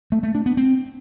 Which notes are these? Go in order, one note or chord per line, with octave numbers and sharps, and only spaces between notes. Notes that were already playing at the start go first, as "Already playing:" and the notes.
A3
A3
D4
B3
C4